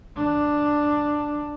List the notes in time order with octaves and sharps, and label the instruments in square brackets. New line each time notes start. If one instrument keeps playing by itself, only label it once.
[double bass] D4